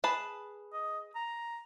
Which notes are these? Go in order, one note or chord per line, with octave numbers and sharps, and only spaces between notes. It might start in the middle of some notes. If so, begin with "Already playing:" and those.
G#4 B4 A5
D#5
A#5